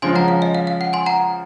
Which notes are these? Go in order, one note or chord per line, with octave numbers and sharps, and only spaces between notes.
C#3 F3 G#3 C#4 G#5 C6
F#5 A#5
F5
D#5
F5
F5
F#5
G#5 C6
F#5 A#5